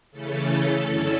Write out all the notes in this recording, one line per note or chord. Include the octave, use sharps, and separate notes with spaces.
C#3 E3 A3 C#4 A4
F#2 D3 F#3 C#4 E4